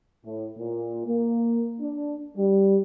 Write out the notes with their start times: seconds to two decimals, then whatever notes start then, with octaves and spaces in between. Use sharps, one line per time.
0.25 A2
0.58 A#2
1.06 A#3
1.81 D4
2.36 G3